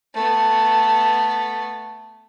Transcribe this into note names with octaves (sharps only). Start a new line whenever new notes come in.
A3 B3